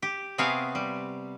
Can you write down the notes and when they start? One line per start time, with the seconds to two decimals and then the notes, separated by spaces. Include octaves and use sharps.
0.02 G4
0.38 C3 B3 C4 G#4 C#5 F5
0.75 G3